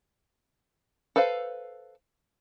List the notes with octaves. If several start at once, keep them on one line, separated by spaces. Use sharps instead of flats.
A4 B4 C5 F5